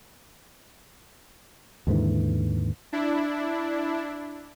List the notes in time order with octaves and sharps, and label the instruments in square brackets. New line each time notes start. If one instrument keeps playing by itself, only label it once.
[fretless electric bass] D#2 G#2 D3 E3
[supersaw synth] D4 E4